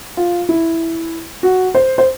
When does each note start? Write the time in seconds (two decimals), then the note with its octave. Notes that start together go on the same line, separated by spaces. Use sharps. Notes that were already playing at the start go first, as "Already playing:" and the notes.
0.17 F4
0.49 E4
1.43 F#4
1.75 C5
1.98 C5